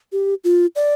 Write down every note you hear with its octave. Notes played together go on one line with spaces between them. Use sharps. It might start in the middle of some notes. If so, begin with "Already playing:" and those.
G4
F4
D5